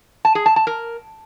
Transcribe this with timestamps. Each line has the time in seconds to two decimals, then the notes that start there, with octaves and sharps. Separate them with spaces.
0.25 A5
0.35 G#4
0.46 A5
0.56 A5
0.67 A#4